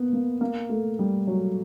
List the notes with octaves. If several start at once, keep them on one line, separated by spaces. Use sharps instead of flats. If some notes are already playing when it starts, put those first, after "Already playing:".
Already playing: A#3 B3
A#3
A#3
A3
G3
F#3